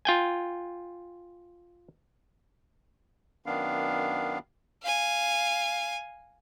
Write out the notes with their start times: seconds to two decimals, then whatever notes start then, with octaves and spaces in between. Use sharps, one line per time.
0.05 F4 G5 G#5
3.46 F#2 D#3 B3 D4 F5
4.84 F5 G#5